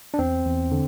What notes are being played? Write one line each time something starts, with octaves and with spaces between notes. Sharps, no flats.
D4
E2 C4
E2
D3